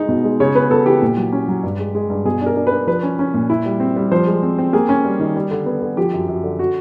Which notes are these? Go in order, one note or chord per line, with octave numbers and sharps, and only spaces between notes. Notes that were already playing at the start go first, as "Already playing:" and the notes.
Already playing: G#3 D#4
B2
G#3
C#3 C#5
B3 B4
B3 A4
E3 G4
A#2
F#3
C#4
F#3
G2
G#3
G#3
G2
B2 G#4
D4 A#4
D4
B4
D4
F3 B4
C#4
C#4
A#2
E4
G3
C4
G3
F3 C5
G#3
C4
C4
A#3 G#4
C#4
G3
D#3
G3
D3
B3
D3
F3 G4
F#2
F#2
D3
F#4